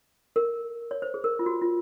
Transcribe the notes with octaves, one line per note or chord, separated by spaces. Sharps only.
A#4
C#5
C5
G#4
A#4
F4
F#4
F4